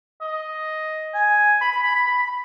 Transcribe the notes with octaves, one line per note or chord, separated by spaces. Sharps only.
D#5
G#5
B5
B5
B5
B5
B5
B5